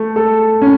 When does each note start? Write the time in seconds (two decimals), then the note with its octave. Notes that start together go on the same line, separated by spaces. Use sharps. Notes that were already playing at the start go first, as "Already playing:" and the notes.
Already playing: A3
0.16 A4
0.62 C#4